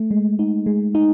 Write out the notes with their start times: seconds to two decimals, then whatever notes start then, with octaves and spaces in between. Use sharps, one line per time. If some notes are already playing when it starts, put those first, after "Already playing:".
Already playing: A3
0.11 G#3
0.39 D#4
0.66 G#3
0.95 D#4